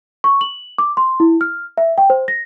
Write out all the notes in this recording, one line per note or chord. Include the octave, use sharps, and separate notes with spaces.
C#6
F#7
D6
C6
E4
F6
E5
G5
C5
A#6